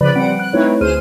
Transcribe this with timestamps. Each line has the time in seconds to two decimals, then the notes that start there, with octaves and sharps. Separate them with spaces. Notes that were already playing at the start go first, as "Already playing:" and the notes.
0.01 C#3 F3 B4 D5 B5
0.15 G3 C4 F#5 D7
0.39 F#6
0.53 A3 C4 D#4 E4 B4 C#5
0.81 D2 G#4 C5 F6 D#7